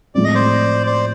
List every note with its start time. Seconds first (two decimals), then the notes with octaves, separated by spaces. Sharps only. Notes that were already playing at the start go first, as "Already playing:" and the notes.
0.15 A2 F3 G#3 C4 D5
0.24 D#5
0.35 C5 D5
0.86 C5 D5